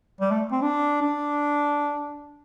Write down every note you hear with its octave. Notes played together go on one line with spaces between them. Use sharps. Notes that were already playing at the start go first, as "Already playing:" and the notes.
G3
A3
C4
D4
D4